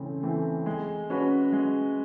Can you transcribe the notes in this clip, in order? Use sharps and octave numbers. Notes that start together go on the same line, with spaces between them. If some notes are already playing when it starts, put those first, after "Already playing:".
Already playing: C#3 E3 A3 C4
E3 A3 C4
G#3
C#4 F#4 B4
G#3